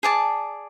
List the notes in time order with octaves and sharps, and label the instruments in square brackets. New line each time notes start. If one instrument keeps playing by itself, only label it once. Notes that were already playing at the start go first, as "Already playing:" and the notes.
[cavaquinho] G#4 D5 A5